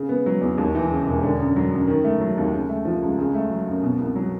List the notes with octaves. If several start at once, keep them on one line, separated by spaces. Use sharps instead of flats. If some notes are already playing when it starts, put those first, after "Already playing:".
Already playing: C#3
B3
F#3
E2
D#2
E3
C#3
E1
D3
F#2
F#3
F#2
D#3
A3
F#3
D#2
C#3
A3
F3
C#2
C#3
A3
F#3
F#2
B2
C2
F#3